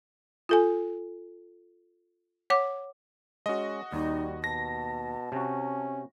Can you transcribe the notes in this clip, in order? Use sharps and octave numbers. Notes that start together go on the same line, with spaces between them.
F4 A4 G#5
C#5 F#5 D6
G#3 C#4 F#4 D#5
D#2 G3 D#4
B2 A5 A#6
C3 C#4 F#4